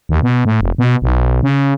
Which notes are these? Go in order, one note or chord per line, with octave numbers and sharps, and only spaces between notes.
D#2
B2
A2
F1
B2
B1
C#3